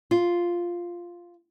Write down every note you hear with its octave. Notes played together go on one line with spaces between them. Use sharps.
F4